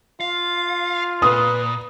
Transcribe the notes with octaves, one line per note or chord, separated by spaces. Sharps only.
F4 F5
A#2 B4 D#6